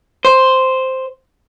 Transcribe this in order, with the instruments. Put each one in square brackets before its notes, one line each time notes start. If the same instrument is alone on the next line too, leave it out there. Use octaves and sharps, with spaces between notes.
[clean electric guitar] C5